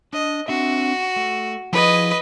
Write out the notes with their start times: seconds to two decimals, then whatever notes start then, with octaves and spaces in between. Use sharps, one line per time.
0.13 D4 D#5
0.48 C4 D4 F#4 E5
1.16 A3
1.73 F3 E4 G#4 B4 D#5